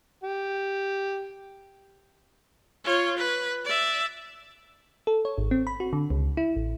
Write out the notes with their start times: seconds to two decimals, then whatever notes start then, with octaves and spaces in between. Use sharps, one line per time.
0.23 G4
2.84 F4 C#5
3.18 B4
3.65 D5 E5
5.07 A4
5.25 C#5
5.38 G#1
5.51 C4
5.67 B5
5.80 F#4
5.93 D3
6.10 C#2
6.37 E4
6.56 A1